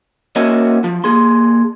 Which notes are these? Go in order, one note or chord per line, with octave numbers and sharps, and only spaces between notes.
A#3 C#4 F#4 D#5 E5
F3
A#3 G#4 C6